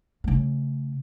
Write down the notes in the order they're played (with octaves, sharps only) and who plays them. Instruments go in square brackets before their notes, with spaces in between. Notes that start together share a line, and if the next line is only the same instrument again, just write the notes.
[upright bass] C#3 A3